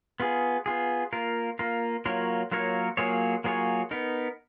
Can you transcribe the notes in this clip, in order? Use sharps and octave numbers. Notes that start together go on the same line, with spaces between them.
B3 F4 G#4
B3 F4 G#4
A#3 F4 A#4
A#3 F4 A#4
F#3 A#3 F4 A#4 C#5
F#3 A#3 F4 A#4 C#5
F#3 A#3 F4 G#4 C#5
F#3 A#3 F4 G#4 C#5
B3 D#4 A#4